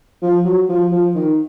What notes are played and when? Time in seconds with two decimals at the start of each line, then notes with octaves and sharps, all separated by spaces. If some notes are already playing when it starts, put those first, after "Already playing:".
0.22 F3
0.45 F#3
0.69 F3
0.92 F3
1.15 D#3